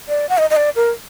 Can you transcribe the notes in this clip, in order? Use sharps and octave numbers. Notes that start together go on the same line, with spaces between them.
D5
F#5
D#5
D#5
D5
A#4